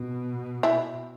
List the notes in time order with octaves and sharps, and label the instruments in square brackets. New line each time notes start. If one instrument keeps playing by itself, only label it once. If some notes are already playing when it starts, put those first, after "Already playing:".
Already playing: [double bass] B2
[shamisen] E4